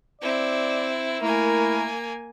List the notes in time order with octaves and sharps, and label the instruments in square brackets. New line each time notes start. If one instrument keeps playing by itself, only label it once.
[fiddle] C4 E4 [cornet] D5
[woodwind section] A3 E4 [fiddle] A#3 G#5 [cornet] A#4